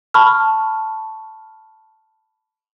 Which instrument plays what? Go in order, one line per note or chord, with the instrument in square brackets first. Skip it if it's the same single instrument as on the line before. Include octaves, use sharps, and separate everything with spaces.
[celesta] A5 B5 C#6 F6